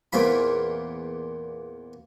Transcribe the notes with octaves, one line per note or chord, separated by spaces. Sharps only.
E2 A#2 C4 F4 B5